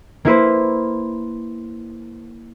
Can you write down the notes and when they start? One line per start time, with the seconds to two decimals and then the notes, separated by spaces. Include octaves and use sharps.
0.25 A#3 E4 B4 C5